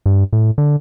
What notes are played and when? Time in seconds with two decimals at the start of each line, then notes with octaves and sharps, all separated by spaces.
0.06 G2
0.33 A2
0.58 D3